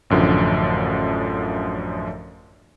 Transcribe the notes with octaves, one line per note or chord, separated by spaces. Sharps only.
A1 F#2 D3 F3